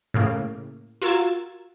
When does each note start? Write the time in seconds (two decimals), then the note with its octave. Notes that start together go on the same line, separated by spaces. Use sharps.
0.14 A2 C#3 A#3
1.02 F4 F#4 A#4 E6 G#6 A6